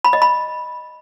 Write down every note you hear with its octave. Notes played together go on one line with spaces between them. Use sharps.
B5
D#5
B5